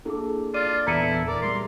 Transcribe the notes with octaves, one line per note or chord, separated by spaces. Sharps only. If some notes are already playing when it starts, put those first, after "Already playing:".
A#3 D4 E4 G#4 A4 D6
F4 D5 D#7
E2 A#2 E4 A4 E5 A#5 C#7 D#7
A#4 D5
G3 G#3 C6